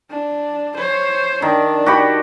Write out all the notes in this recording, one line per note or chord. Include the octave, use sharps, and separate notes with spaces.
D4
C5 C#5
D#3 D4
F#4 G4 B5